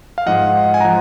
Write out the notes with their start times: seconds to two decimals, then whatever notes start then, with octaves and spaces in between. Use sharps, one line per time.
0.18 F5
0.26 G#2 F3 D#5 F#5
0.74 G#5
0.80 F3 F#5 A#5